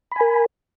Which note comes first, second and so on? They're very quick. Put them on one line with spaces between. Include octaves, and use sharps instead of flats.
B5 G#5 A#4